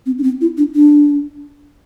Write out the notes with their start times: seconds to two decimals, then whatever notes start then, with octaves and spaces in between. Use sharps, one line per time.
0.06 C4
0.18 D4
0.23 C4
0.41 E4
0.58 D4
0.75 D4